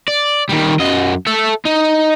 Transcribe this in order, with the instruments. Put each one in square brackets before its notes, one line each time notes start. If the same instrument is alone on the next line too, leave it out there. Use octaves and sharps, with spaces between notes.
[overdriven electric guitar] D5
D#3 G3
F#2 D#5
A4 E5
D#4